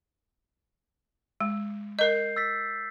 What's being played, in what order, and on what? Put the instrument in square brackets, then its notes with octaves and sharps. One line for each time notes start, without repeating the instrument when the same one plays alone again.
[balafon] G#3
[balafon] A#4 D#5 [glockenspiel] G6 C7
[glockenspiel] E6 A6 B6